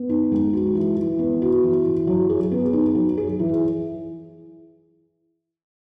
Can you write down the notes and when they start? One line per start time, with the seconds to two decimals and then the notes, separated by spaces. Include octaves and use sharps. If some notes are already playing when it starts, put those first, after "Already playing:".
Already playing: B3
0.09 D#4
0.32 G#3
0.53 F#4
0.75 E3
0.97 E3
1.19 B3
1.42 F#4
1.64 E3
1.86 E3
2.07 F#3
2.30 G#4
2.51 B3
2.73 D#4
2.95 F#3
3.17 G#4
3.39 E3